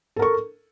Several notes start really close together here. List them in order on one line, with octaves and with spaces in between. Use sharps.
A4 A#4 C#6